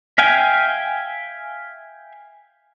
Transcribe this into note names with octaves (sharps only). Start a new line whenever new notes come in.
E5 F5 G5 G#5